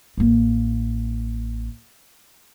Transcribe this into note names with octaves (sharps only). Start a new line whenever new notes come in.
A1 A#3